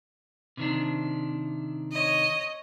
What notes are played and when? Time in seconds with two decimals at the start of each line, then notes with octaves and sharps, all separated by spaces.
0.57 C3 D#3 D4
1.92 C#5 D#5